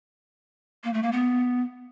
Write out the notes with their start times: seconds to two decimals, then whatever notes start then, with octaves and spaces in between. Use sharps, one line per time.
0.84 A#3
0.93 A3
1.03 A#3
1.12 B3